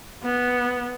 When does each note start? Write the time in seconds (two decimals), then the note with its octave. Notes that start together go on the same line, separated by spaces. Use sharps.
0.24 B3